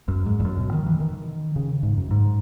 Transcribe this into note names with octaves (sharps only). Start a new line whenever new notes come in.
F#2
G#2
E2
F#2
B2
D#3
E3
D#3
C#3
G#2
F#2
G#2